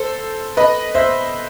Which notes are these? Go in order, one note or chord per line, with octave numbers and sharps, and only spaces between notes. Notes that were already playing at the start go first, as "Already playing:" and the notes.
Already playing: A4 C5
B4 D#5
C5 E5